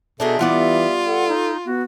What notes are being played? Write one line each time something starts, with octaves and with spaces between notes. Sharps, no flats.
B2 D4 D#4 G#4 A4 E5
E3 G3 B3 F4 D5
A4 F#5
D#4
B3 F#4